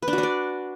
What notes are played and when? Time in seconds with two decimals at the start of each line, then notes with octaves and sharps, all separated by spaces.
0.02 B4
0.08 D4
0.13 F#4
0.18 D4
0.23 D5